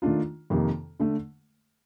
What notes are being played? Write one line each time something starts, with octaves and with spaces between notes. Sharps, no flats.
D#3 A3 D4 F4
F2 C3 D#3 A#3
D3 A3